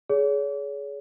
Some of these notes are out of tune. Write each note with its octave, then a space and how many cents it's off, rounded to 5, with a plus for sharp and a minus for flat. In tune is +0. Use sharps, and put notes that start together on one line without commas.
G#4 +20 C#5 +35